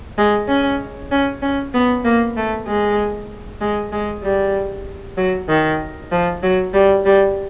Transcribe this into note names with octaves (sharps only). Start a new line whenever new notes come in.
G#3
C#4
C#4
C#4
B3
A#3
A3
G#3
G#3
G#3
G3
F#3
D#3
F3
F#3
G3
G3